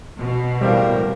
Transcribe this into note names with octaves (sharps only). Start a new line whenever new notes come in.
B2
A2 G3 C4 G4 A#4 F5